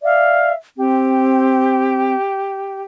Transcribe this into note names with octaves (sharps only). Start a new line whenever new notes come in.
D5 E5 F5
C4 G4